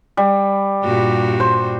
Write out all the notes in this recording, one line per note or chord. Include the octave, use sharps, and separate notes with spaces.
G3
G2 A#2 F#4
C5